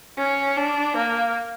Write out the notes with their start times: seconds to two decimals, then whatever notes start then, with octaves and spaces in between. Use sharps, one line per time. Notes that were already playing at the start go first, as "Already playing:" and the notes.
0.18 C#4
0.57 D4
0.97 A#3